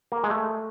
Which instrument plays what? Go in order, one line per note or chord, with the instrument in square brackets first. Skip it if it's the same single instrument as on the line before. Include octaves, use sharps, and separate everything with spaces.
[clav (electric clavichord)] A#3
G#3
A3